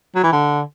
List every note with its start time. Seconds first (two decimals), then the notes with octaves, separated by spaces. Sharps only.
0.15 F#3
0.24 E3
0.33 D3